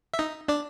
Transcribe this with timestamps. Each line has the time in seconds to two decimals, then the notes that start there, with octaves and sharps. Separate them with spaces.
0.14 E5
0.19 D#4 D#5
0.48 D4 D5